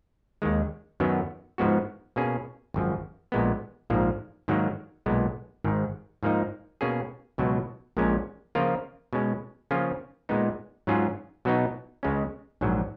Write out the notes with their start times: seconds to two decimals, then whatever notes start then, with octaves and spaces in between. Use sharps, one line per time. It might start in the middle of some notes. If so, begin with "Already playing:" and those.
0.42 D#2 D#3 G#3
1.00 F#2 D#3 F#3 B3
1.58 G#2 F3 G#3 B3 F#4
2.16 B2 A#3 C#4 G#4
2.74 G#1 F#2 F3
3.32 A#1 A#2 G#3 B3
3.90 A#1 G#2 F3 A#3
4.48 G#2 D#3 F#3 A#3
5.06 B1 A#2 G#3 B3
5.64 G#1 G#2 D#3
6.23 G#2 F3 A#3 D#4
6.81 B2 A#3 C#4 G#4
7.38 C#2 B2 F#3
7.97 A#1 A#2 G#3 C#4
8.55 C#3 F3 A#3 F4 A#4
9.13 B2 G#3 C#4
9.71 C#3 F3 A#3 C#4 F4
10.29 A#2 G#3 B3 D#4
10.87 G#2 F#3 C#4 F4 G#4
11.45 B2 F#3 B3 D#4
12.03 C#2 C#3 G#3 C#4
12.61 A#1 G#2 F#3